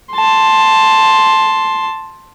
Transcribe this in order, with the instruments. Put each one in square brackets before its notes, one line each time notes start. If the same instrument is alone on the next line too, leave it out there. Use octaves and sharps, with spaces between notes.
[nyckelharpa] A5 C6